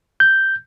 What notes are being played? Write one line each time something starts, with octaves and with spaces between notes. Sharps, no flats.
G6